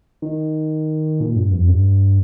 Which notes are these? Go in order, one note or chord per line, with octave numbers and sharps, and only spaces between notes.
D#3
A#2
G2
F2
G2